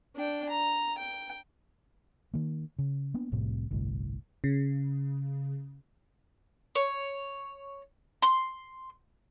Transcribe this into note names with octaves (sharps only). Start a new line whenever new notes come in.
D4 G5
A#5
G5
D#3 A#3
C#3
A#3 B3 D4
F1 C2 A2 C3
G1 C2 A2
C#3
C#5
C6